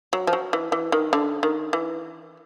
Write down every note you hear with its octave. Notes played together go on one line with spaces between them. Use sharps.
F#3
F3
F#3
E3
E3
D#3
D3
D#3
E3